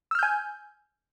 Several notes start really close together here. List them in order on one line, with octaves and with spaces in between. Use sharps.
E6 F6 G6 G#5